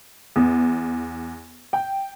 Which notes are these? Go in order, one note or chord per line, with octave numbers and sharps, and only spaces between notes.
E2
G5